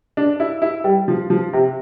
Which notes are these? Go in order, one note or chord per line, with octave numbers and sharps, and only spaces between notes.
D4
E4
E4
G3
F3
F3
C3